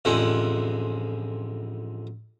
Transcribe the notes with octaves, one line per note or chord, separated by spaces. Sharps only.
A1 F2 D3 G#3 F#5 C6